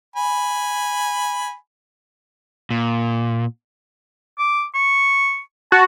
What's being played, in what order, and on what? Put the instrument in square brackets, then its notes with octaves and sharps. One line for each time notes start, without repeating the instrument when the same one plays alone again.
[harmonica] G#5 B5
[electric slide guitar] A#2
[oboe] D6
C#6
[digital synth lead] F#4 [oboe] A5